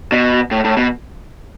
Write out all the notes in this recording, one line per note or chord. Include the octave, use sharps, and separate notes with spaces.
B2
A2
A2
B2